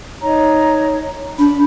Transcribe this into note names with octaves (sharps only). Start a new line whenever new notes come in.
D#4 C#5 A#5
D4 B5